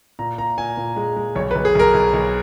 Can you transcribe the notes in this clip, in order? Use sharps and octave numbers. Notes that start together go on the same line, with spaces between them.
A#2 A#5
A#2 A#5
A#2 G#5
A#2
G#3
G#3
B1 C#5
B4
B1
G#4
B1 A#4
B1
B1